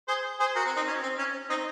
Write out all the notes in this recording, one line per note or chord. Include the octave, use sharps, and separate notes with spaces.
G#4 C5
G#4 C5
F#4 A#4
C4
C4 D#4
C#4
C4
C#4
C4 D#4